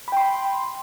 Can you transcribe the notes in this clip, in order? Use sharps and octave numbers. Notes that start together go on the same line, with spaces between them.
G5 B5 C6